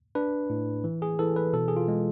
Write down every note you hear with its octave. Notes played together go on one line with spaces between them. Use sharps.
D4 B4
A2
E3
G#4
E3 A4
B4
B2 A4
G#4
F4
G#3